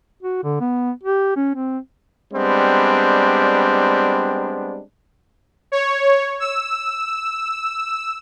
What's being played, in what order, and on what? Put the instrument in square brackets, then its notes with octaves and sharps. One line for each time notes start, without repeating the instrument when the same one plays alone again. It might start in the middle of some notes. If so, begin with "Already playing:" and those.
[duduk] F#4
D3
B3
G4
C#4
C4
[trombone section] G3 G#3 B3 C4 D4
[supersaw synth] C#5
E6